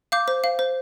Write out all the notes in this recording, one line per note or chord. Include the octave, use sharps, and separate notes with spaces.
F5 D6 G6
C5
F5
C5